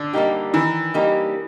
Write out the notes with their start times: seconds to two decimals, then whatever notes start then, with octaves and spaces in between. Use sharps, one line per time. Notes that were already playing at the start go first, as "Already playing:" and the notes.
Already playing: D3
0.13 G3 A#3 D#4 G4
0.54 D#3 E3
0.94 G3 A#3 D#4 G4